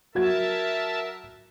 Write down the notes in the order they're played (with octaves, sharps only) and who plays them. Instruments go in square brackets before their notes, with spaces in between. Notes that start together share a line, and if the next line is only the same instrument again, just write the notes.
[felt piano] F#3 F#4 G#6 [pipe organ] A#4 E5 A5